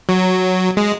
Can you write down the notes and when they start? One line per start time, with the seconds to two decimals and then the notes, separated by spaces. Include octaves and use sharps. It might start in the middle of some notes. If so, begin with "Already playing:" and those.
0.09 F#3
0.77 G#3